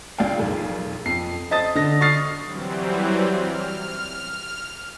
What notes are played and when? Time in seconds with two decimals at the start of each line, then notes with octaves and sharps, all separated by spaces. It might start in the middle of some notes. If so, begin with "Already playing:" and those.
0.18 C#2 G#3 D4 F5 G5
0.38 B1 F2 G#4 A#4
1.06 F2 C7
1.51 C5 D#5 A5 D#6 A6
1.75 D3 A#6
2.01 C#6 D#6 F6 A6 C7
2.43 E3 F#3 G3 C4
3.34 F6